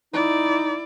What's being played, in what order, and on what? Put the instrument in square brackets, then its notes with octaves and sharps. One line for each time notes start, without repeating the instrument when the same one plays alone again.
[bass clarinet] D#4 [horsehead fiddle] E4 D5